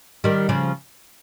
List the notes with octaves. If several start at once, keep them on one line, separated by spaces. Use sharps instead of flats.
D#3 G3
C#3 F3